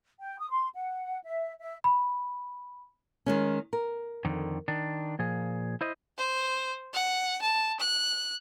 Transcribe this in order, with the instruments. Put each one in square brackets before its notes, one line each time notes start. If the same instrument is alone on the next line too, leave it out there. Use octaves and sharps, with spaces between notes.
[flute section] G5
D#6
C6
F#5
E5
E5
[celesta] B5
[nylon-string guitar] D#3 G#3 C#4
A#4
[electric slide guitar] F2 D3 D#3
D#3 D4
A#2 F3 G#4
E4 C5 D#5
[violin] C5
F#5
A5
F#6